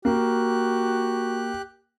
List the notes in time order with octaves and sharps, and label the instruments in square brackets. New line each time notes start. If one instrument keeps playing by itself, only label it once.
[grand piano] A#3 [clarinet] F#4 [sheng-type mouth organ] G4 F#6